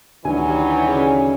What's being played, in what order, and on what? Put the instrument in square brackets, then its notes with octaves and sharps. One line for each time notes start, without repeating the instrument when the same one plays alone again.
[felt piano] D2 D#3 [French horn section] E3 F#3 G3 [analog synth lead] G#5
[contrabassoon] C#3